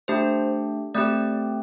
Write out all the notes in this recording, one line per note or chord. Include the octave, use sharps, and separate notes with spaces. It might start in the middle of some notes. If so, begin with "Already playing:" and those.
A3 D4 G4 C5
A3 C4 G4 D5